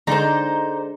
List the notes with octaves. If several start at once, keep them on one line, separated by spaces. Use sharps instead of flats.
D3 G#3 D#4 C5 D5